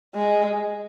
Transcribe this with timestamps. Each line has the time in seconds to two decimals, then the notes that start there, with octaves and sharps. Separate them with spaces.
0.15 G#3